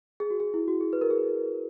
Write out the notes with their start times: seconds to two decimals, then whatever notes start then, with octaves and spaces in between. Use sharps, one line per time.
0.20 G#4
0.30 F#4
0.40 G#4
0.54 E4
0.68 F#4
0.81 G#4
0.93 B4
1.01 A#4
1.11 G#4